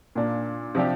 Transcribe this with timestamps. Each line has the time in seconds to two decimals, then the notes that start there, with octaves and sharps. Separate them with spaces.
0.15 A#2 A#3 D4
0.75 C3 F3 D4 G4